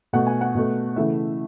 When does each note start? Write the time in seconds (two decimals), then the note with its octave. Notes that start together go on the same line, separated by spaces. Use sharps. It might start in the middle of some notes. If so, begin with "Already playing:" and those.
0.13 B2 A3 F#5
0.27 G#5
0.41 F#5
0.55 B2 A3
0.96 C#3 E3 A3 E5